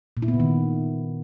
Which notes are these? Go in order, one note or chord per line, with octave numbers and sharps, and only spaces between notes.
A#2
E4
B3
C#3
D#3